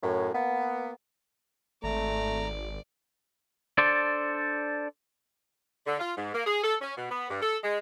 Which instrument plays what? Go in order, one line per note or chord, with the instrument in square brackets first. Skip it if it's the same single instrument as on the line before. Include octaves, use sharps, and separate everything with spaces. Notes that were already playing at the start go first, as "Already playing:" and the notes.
[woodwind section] F#2 A2
A#3 B3
[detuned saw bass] G#1 [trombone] A3 [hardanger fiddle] D5 [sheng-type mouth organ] A#5
[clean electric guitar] D4 A4 C5 D5
[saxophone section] D3
F4
G#2
A#3
G#4
A4
C#4
B2
B3
G2
A4
G#3